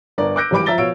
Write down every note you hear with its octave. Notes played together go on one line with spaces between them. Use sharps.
G1 D4 A#4 D5
D6 E6 F#6 G6 A#6 D7
G#1 E3 G3 B5 D6 D7
F3 E5 A#5 A6 G7
B2 F3 C#5 F5 E6 D7